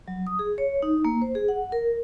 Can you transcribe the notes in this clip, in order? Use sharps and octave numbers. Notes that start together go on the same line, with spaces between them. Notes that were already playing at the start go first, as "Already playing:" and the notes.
F#3
D#6
G#4
C#5
D#4
A#3
C5
G#4
F#5
A#4